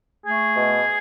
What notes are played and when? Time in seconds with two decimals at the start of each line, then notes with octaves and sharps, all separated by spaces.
0.25 A3 G#4
0.55 B2